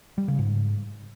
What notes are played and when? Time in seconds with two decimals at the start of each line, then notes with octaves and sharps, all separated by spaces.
0.18 G3
0.28 C#3
0.39 G#2